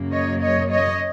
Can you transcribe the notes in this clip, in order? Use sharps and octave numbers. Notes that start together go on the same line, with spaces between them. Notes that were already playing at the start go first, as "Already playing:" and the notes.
Already playing: F#2 C#3 F#3 A#3
C#5 D#5
C#5 D#5
C#5 D#5